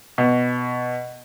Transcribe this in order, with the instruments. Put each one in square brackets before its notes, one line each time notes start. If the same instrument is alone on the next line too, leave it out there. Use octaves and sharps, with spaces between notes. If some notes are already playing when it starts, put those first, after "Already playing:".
[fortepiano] B2